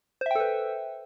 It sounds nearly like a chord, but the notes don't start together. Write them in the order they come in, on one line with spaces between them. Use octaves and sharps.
C5 E5 G5 A4 B4